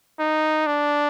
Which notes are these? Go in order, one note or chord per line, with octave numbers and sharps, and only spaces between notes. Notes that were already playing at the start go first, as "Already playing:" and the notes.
D#4
D4